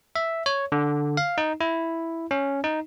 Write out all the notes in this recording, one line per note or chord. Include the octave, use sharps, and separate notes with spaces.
E5
C#5
D3
F5
D#4
E4
C#4
D#4